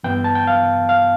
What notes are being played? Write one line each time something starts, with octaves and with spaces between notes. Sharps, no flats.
G2 E3 B3 G5
A5
G5
F5
F5